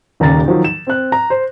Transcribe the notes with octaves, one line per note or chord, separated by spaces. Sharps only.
D#1 D#2 C#3 A#5 A6
D#3 F3 F#3
E7
C4 F#6
A#5
C5